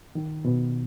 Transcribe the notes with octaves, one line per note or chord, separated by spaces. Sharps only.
D#3
B2